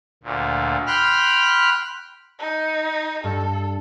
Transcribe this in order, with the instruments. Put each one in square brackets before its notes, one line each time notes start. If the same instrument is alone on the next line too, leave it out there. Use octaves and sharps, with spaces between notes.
[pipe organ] D2 A#2
G5 B5 C6 F6 F#6
[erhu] D#4
[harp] G2 [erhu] A4